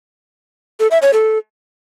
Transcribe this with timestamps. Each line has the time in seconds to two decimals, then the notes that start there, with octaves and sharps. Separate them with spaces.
0.80 A4
0.91 E5
1.02 C#5
1.13 A4